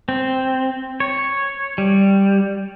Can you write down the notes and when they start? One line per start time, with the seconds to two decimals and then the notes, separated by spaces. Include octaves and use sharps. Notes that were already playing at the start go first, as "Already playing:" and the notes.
0.09 C4
1.00 C#5
1.78 G3